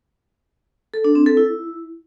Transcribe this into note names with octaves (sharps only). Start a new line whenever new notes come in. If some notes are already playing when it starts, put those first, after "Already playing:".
A4
D4
C4
A4
E4